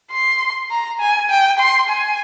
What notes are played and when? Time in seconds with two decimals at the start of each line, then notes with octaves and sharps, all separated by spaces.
0.11 C6
0.71 A#5
1.00 G#5
1.30 G5
1.59 C6
1.89 G#5